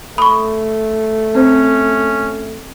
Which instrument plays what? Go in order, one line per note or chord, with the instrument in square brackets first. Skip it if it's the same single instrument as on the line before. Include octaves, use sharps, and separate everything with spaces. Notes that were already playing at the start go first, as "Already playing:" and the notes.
[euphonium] A3 [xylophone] B5 C#6 [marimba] D#6
[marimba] C4 C5 [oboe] C#4